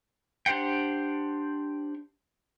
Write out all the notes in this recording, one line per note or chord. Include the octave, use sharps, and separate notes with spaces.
D4 G4 C5 F#5 G5